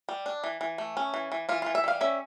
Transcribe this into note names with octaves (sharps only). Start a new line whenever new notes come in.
G3
D4
E3
E3
A3
C#4
E3
E3
E3 F4
E3 F4
E5
G3 F5
C#4 E5